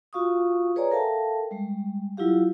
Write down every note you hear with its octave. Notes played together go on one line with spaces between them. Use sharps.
F4 F#4 F5 C#6 D#6
G#4 B4 C#5 D5 G#5 A#5
A4 A#4 E5 F5 G5 A5
G3 G#3
F#3 E4 F4 G4 F5